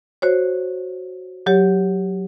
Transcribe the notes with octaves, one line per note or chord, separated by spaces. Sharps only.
F#4 C5 C#5
F#3 G4 C#5